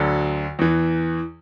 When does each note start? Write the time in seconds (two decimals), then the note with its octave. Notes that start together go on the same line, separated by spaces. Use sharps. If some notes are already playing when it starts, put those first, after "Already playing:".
Already playing: D2 D3 F#3 A4
0.59 E2 E3